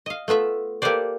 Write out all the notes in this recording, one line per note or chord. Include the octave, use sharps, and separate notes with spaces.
D#5 F5
A3 B3 F4 E5
A#3 G4 A4 B4 C5 D5